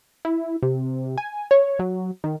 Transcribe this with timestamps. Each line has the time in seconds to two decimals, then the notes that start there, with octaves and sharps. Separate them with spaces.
0.25 E4
0.63 C3
1.18 G#5
1.51 C#5
1.79 F#3
2.24 D#3